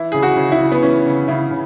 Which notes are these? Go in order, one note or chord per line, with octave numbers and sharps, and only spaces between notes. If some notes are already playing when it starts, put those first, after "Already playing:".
Already playing: E3 E4
C#3 G#4
F#4
C#3
E4
C#3
B3
E3 C#4
C#3
C#3 E4
C#3